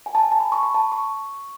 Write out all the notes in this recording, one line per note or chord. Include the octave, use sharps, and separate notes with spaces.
G#5
A5
G#5
A5
B5
C#6
B5
A5
C#6